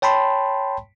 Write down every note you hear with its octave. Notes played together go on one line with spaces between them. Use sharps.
C#5 G5 A5 B5 C6